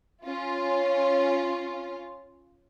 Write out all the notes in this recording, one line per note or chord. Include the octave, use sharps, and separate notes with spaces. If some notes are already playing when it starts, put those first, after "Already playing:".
C#4 F4